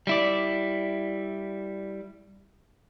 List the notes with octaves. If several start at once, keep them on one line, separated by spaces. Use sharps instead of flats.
G3 E4 D5